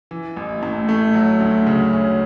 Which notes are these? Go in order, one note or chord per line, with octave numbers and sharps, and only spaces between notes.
E3
A1
A2
A3
F#3
D2
C#3
C#4